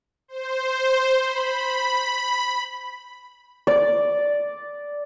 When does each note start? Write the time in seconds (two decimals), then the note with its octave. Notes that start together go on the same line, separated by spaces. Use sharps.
0.28 C5
1.23 B5
3.67 D5